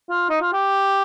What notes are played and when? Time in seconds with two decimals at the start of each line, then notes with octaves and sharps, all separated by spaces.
0.10 F4
0.29 D#4
0.41 F4
0.53 G4